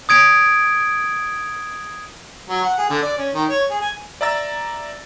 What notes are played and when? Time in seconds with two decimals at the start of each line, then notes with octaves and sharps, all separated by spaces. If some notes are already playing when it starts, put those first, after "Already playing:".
0.09 D#6 G#6 D7
2.49 F#3
2.63 F#5
2.78 G#4
2.90 D3
3.02 D5
3.18 C#4
3.34 D#3
3.49 C#5
3.70 G#4
3.81 G#5
4.21 D5 E5 A#5 E6 A6